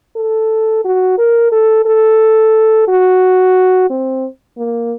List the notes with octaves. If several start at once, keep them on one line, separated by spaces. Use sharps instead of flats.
A4
F#4
A#4
A4
A4
F#4
C4
A#3